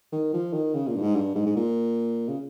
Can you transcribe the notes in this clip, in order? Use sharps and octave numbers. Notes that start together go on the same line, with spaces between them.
D#3
F3
D#3
C#3
A#2
G2
G#2
G2
G#2
G#2
A#2
C#3